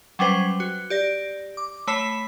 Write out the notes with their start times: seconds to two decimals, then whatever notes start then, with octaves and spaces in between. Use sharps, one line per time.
0.19 F#3 G3 C#4 B4 C5
0.60 F#4
0.90 G4 D5 A#6
1.57 D6
1.87 A3 C#5 B5 B6 C7 E7